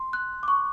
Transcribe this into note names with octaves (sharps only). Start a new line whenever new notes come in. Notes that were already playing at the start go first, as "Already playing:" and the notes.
Already playing: C6
F#6
D6
C#6